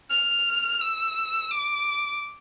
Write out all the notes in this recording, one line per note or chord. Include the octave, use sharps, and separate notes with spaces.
F6
E6
D6